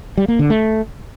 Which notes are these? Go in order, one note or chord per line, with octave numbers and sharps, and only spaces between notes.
G3
A#3
D3
A3